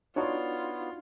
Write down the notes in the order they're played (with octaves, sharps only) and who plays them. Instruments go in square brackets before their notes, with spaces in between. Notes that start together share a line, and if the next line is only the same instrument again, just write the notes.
[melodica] B3 [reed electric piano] D4 D#4 F#4 [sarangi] F4 [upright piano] C#5 D5 C6